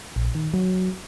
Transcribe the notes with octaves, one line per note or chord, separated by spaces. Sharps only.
A#1
D#3
F#3